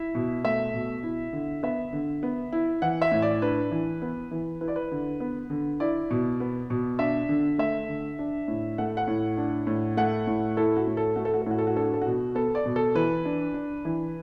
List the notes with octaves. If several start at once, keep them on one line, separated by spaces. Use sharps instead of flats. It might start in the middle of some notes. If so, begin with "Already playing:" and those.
Already playing: E4 E5
B2
A3 E5
B2
E4
D3
B3 E5
D3
B3
E4
E3 F#5
E5
A2
D5
D4 B4
E3
B3
E3
E4 B4
D5
B4
D3
B3
D3
E4 D5
B2
B3
B2
D4 E5
D3
A3 E5
D3
D4
A2
A3 F#5
F#5
A2
D4
A2
A3 F#5
A2
E4 A4
F#4
A2
A4
A3 F#4
A4
F#4
A4
A2 F#4
A4
F#4
D4 A4
F#4
A4
B2 F#4
B3 A4
D5
B2
A4
E3 B4
D4
D4
E3